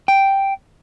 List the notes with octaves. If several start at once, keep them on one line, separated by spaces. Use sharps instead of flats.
G5